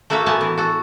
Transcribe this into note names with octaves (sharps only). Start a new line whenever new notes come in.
A3 A#3 F#4 E5 F5
A2 A#3 B3 G#5 A5
E3
F#4 A4